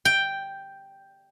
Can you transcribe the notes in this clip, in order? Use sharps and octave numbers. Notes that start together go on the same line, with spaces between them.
G5